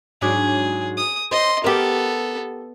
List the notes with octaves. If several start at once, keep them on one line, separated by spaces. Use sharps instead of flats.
G#2 F#3 D4 G#4
D#6
C5 D#5 C6
B3 G4 A4 A#4